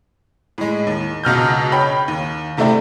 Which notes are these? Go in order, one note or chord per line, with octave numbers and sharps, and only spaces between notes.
A2 G#3
D#2
C#2 B2 F6 G6
C#5 G5 B5
D#2
G#2 C3 A3 D4 E4 G4